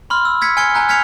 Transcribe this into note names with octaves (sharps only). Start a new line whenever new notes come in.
B5 C6 F6
E6
E6 G#6 B6 C#7
G#5 F6 G#6 C#7 G7
G#5 A#5 F#6
F6 G#6 B6 C#7 F7